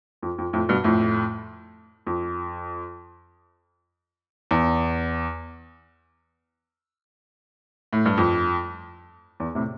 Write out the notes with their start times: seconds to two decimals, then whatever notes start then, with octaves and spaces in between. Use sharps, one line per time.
0.22 F2
0.38 F2
0.53 F2 A2
0.69 G2 B2
0.84 F2 A2
2.07 F2
4.51 E2
7.93 A2
8.06 G2
8.17 F2
9.40 E2
9.55 A2 C3